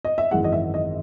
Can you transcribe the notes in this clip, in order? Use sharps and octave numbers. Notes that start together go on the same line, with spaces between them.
D#5
E5
G#1 F#2 E3 G#3 F#5
D#5
E5
D#5